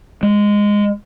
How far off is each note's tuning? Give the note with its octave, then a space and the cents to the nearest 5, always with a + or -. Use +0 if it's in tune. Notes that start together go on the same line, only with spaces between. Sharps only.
G#3 -10